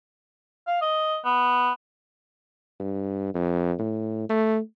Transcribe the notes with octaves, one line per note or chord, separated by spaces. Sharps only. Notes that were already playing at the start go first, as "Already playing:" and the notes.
F5
D#5
B3
G2
F2
A2
A3